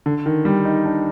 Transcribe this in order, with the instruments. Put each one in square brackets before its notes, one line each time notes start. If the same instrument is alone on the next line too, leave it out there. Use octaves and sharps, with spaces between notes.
[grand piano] D3
D#3
G3
D#4
D4